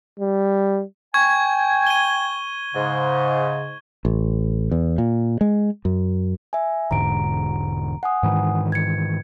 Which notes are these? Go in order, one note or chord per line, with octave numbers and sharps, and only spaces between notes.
G3
G5 G#5 C#6 G#6
D#7 G7
G#2 C#3
A1
E2
A#2
G#3
F#2
E5 G#5
E1 G#2 D3 A#5 D7
F#5 G#5 D#6
G#2 D#3 E3
G#6 C#7